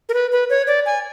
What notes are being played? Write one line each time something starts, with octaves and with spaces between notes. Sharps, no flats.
A#4
B4
B4
C#5
D5
G#5